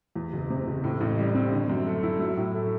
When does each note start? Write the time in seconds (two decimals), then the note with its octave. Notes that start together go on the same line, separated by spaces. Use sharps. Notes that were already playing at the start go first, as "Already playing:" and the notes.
0.16 E2
0.33 F#1
0.50 C3
0.67 F#1
0.84 A2
1.01 A1
1.18 G3
1.35 C4
1.52 D3
1.69 F#2
1.87 A3
2.03 E4
2.19 F#3
2.37 A2
2.54 A3